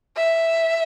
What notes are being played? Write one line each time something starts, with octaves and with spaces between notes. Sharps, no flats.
E5